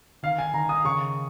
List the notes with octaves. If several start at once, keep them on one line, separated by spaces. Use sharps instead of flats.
D#3 F5
G#5
D#3 A#5
D#6
C#3 C#6